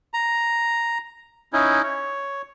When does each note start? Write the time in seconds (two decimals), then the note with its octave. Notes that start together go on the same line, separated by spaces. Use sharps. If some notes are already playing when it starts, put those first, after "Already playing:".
0.14 A#5
1.53 C#4 D#4 E4
1.83 C#5